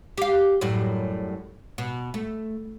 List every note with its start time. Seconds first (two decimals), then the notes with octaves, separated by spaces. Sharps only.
0.18 G4 F5
0.61 F#2 A2 G3
1.78 B2
2.14 A3